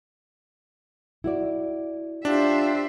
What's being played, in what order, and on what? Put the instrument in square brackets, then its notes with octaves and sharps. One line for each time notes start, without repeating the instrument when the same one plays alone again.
[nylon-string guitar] E4 F#4 D5
[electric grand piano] D4 [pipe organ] F4 G4 [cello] C5 E5